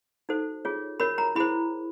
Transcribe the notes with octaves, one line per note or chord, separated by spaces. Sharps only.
D#4 F#4 A4 C5
F4 G#4 C#5
F#4 A#4 C#5 B5
A#5
E4 G#4 C5 B5